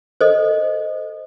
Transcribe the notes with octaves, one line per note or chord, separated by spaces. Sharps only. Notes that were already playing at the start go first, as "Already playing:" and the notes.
A4 C5 D#5